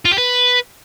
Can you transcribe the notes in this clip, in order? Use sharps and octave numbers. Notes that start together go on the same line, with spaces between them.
F4
G4
B4